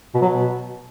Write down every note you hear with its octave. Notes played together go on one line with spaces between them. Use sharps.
B2
F#3
B2